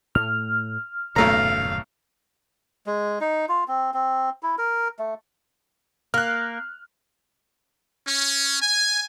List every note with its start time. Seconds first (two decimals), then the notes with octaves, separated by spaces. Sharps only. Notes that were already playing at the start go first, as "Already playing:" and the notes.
0.15 A2 A3 F6
1.16 D#1 B1 F#2 C#3 A3 F5 A#5
2.86 G#3
3.21 D#4
3.49 F4
3.68 C4
3.94 C4
4.43 E4
4.58 A#4
4.99 A3
6.14 A#3 F6 F#6
8.07 C#4
8.60 G#5